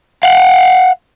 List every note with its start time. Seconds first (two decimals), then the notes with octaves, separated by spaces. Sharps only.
0.23 F5 F#5